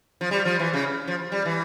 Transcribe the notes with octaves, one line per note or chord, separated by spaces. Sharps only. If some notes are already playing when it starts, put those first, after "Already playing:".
F3
G3
F3
E3
C#3
F3
G3
E3